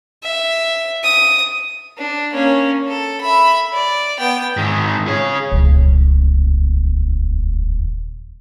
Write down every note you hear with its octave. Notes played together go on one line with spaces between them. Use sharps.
E5
D#6
D4
A#3 C#4
A4
E5 B5
D5
B3 G5
G#2 D#3
G#4 C#5
D#1 C#2